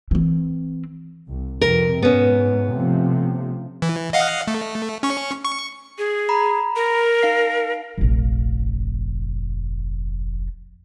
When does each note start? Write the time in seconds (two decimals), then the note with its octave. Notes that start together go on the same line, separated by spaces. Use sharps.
0.11 E3 C4
1.28 C2
1.61 F2 C3 A#4
2.02 G#2 B3 C#4
2.70 C3 F3 A3
3.82 E3
4.13 D#5 F5 F#5
4.47 A3
5.03 C#4 C#6
5.45 C#6
5.98 G#4
6.29 A#5 B5
6.76 A#4
7.22 D#4 F5 C7
7.98 F1 A#1